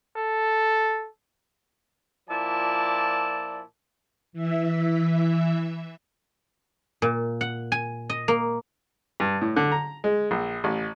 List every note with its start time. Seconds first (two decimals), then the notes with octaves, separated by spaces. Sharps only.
0.16 A4
2.29 A#2 F3 E4 D5 A5
4.33 E3 E5
7.02 A#2
7.41 F#5
7.72 G#5
8.10 D#5
8.28 A#3
9.20 G2
9.41 A2
9.56 D3
9.72 A#5
10.04 G#3
10.31 A#1
10.64 A1